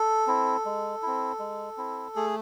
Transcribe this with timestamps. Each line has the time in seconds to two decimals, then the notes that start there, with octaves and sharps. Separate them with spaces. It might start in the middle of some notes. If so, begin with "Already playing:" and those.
Already playing: A4
0.27 C4 E4
0.65 G#3
1.02 C4 E4
1.39 G#3
1.77 C4 E4
2.16 A3 G#4